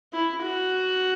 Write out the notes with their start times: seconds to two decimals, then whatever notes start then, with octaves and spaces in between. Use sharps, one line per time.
0.13 E4
0.42 F#4